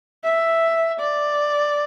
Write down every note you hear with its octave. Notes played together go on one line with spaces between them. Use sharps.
E5
D5